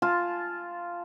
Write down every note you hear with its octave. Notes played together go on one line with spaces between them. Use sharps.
F4 G#5 A5